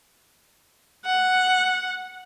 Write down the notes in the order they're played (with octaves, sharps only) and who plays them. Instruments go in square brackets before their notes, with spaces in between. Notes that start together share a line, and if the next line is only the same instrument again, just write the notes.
[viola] F#5